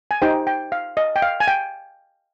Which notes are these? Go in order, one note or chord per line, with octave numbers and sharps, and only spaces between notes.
G#5
D#4 G4 C5 G5
G5
F5
D#5
G5
F5
G#5
G5